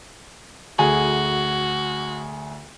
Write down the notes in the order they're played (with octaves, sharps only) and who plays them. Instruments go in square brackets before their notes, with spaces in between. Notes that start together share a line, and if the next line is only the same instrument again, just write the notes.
[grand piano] D2 G#4 G#5 [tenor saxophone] F#4